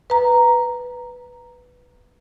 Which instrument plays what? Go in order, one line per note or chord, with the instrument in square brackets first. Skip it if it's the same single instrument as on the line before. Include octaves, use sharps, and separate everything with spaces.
[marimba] B4 A#5